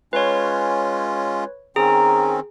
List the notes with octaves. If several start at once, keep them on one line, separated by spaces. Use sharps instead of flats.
G#3 C#4 F4 B4 C#5
D#3 C4 C#4 G#4 A#5